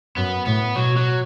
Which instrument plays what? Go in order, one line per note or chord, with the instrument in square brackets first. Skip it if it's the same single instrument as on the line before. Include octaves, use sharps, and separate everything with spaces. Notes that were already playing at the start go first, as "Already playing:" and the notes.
[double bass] F#2 [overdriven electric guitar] B3
[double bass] A2 [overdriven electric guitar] B3
[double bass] B2 [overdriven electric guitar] F#3
[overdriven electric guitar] F#3